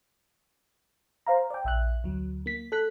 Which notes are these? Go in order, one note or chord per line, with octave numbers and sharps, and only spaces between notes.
C5 F5 A#5
D5 G5
A#1 E5 F#6
D2 F#3
A#3 B6
A4 F#6 B6